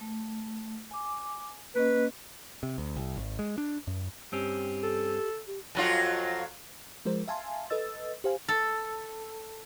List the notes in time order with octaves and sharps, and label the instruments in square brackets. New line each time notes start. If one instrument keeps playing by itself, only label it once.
[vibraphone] A3
G#5 D6
[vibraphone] A#3 C#4 D#5 [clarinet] B4
[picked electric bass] C3
D2
C2
G#1
G#3
D4
F#2
[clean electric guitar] G2 C4 C#4 [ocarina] G4
[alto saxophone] A4
[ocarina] G4
[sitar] F2 F#3 F4
[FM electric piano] F3 G#3 A#4 C5
E5 F5 G#5 A5 C6
A4 B4 D#5 E6 A6
G4 C5 F5 G#5
[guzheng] A4